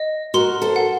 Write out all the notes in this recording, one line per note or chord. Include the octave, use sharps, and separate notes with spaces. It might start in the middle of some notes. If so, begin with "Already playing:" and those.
Already playing: D#5
F#4 A#4 C6
A4 C5
F#5